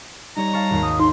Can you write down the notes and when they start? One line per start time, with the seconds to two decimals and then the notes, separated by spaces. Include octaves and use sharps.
0.37 G3 D#4 C#5 A#5
0.53 F5 A5 C#6
0.70 G#1 D#2
0.83 D#6
1.00 D#4 C6